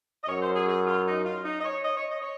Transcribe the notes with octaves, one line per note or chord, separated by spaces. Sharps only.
D#5
F#2 C#5
C5
G#4
G#4
F4
D#4
F4
D#4
D#5
C#5
D#5
C#5
D#5
C#5